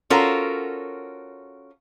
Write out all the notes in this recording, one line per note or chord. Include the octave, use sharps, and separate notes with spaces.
C#4 F4 F#4 A4 A#4 C5